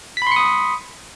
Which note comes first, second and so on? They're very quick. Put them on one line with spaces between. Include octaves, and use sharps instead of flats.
B6 B5 C6 C#7 D#6